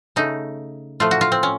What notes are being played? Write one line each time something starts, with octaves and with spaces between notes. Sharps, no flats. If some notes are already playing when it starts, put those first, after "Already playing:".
C#3 A3 D#4
A2 F3 A3 F4
F#4
F4
C4
C#4